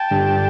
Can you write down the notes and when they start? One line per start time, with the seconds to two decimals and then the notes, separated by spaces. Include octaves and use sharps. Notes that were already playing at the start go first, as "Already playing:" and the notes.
Already playing: G5 A5
0.11 G2 D3 G3